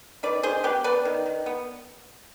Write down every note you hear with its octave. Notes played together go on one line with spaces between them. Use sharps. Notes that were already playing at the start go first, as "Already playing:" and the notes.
D#3 B4 D5
D#3 G#4 C5
B3 G4 B4
B3 B4 D5
D#3
D#3
B3